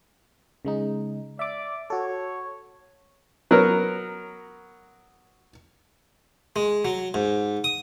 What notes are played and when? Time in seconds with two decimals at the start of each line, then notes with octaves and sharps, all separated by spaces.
0.65 C#3 G#3 D#4
1.39 D5 E5 D6
1.90 F#4 A4 C#5
3.51 F#3 B3 A#4
6.56 G#3
6.85 F#3
7.14 G#2
7.64 D#6